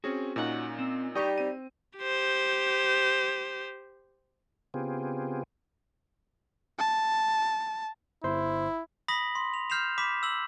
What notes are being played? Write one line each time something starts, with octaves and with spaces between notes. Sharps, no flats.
C4 C#4 F#4 G#4
A#2 C#4 D#4 F#4 F#5
C4
G3 D#4 G4 G5 C#6 D#6
C4 D#7
G4 C5
C#3 B3 C4 F4 G4 G#4
A5
G1 E4 C5 C6
B5 D#6 A#6 B6 F#7
C6
F7
F6 G6 C7 E7 F7
B5 D6 B6 E7
E6 F#7